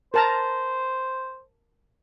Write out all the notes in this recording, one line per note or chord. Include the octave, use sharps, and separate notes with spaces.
A#4 C5 A5 A#5